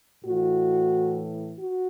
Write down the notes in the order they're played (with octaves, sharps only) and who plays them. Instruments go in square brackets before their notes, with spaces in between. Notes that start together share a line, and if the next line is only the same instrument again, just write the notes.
[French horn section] A2 E3 F#4
F#4